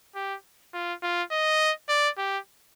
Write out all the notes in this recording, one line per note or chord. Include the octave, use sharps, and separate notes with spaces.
G4
F4
F4
D#5
D5
G4